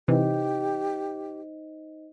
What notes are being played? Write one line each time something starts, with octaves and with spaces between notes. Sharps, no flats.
C3 E3 D#4 G4 C5 D#5